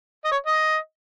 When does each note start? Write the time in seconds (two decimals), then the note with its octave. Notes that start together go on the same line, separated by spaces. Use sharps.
0.25 D#5
0.32 C#5
0.46 D#5